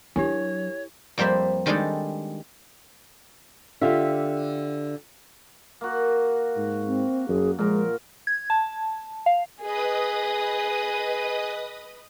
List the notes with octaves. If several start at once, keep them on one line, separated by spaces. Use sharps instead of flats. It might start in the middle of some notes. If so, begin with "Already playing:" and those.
F#3 D4 E4 G4 C#5 G#5
F2 G3 A#3 C5 E5 B5
D#3 G3 G#3 D4 G#4 A4
D3 F4 G4 E5
A#3 F#4
G#2
C4
F#2 G#4
A#2 F3 G#3 A#4
G#6
A5
F5
G#4 B4 D#5 D#6